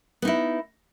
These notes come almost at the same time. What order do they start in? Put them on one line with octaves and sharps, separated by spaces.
B3 D#4 E4